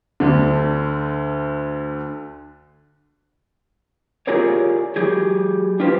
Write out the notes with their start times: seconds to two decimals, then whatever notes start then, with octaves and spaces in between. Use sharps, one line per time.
0.20 D2 D3
4.27 F4 G4 G#4 A#4 C#5 D5
4.96 F#3 G4 G#4
5.80 D4 F4 G4 B4 C5